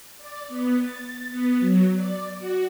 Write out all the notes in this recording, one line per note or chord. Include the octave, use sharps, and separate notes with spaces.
D5
B3
A6
B3
F#3
D5
F#4